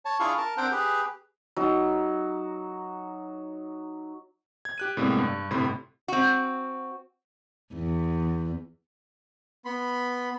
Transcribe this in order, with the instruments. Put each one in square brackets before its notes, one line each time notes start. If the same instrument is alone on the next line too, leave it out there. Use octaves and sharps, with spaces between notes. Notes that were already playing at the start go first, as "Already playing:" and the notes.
[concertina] C#5 A5
D4 E4 F4 G#4 F5 C#6
A#4 A5
C4 D4 A#4 C5 F#5 G5
G4 G#4 B4
[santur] F#3 D#4
[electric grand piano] G#6
G4 F#6 D#7
A2 C3 G3 G#3 A#3 B3
G2
G1 A2 C3 B5 C6
[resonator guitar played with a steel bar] C4 F#4
[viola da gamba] E2
[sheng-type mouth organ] B3 B5 C6